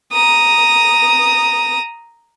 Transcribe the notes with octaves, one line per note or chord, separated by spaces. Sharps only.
A#5 D#6